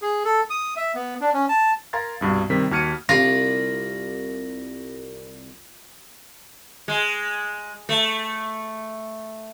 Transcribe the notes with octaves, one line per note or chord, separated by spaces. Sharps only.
G#4
A4
D#6
E5
B3
D4
C#4
A5
A#4 F5 A#5 C6 G#6 A6
C2 G2 B2 F#4
C3 D#3 G3 A#4 B6
D#2 F#4 F6 G#6 C#7 D#7
C2 F4 D6 A#6
G#3
A3